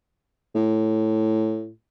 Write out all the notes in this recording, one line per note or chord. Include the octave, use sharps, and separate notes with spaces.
A2